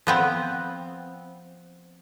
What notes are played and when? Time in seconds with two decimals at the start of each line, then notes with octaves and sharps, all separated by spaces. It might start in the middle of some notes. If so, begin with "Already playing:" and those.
0.07 F3 B3 C4